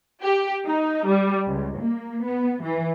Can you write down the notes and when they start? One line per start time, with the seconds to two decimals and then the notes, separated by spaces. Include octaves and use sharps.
0.23 G4
0.66 D#4
1.07 G3
1.47 C#2
1.79 A#3
2.25 B3
2.64 E3